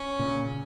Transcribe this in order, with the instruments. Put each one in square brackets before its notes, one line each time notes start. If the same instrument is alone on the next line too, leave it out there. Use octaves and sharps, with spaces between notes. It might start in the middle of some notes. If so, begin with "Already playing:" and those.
Already playing: [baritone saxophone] C#4
[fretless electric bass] A#2 C#3